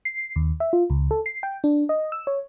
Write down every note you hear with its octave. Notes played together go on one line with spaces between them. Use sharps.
C7
D#2
E5
F4
C#2
A4
C7
G5
D4
D#5
E6
C#5